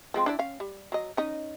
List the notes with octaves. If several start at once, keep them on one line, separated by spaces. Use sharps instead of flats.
F3 G#3 C4
D4 E4 D5
C#4 F5
G3
F#3 D#5
C#4 D#4 D#5